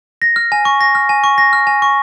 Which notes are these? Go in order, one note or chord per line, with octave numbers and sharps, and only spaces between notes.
A#6
F6
G#5
C#6
A#6
F6
G#5
C#6
A#6
F6
G#5
C#6